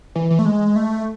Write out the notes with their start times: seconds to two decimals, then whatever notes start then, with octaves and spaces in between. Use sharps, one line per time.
0.15 E3
0.31 E3
0.39 A3
0.45 G#3
0.76 A3